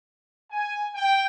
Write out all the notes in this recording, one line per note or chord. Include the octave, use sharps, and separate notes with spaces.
G#5
G5